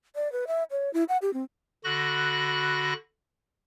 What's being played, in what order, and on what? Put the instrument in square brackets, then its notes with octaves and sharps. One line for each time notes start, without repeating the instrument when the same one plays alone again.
[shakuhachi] D5
B4
E5
C#5
E4
F#5
G4
C4
[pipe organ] D3 F#4 B5 F#6 A#6